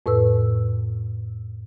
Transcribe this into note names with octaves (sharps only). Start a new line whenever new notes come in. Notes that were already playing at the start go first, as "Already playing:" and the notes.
F2 A2 B4 E6